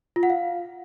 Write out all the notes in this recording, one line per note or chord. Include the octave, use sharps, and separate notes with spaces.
F4
F#5
F5